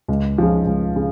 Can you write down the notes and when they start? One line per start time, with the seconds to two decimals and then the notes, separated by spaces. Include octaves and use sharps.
0.08 C#2
0.38 C#3 F3
0.67 C#2
0.96 C#3